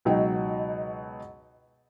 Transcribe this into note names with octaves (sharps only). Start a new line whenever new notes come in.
C#2 B2 F#3 D#4 G5